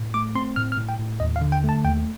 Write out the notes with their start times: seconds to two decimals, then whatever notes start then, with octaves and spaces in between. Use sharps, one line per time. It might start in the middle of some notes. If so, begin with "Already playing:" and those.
Already playing: A2
0.14 A3 D6
0.35 C4 C6
0.56 A2 F6
0.72 F6
0.77 A2
0.89 G5
0.99 A2
1.20 D#2 D#5
1.36 F5
1.41 D3
1.52 G5
1.64 A3
1.69 A5
1.84 D#2 G5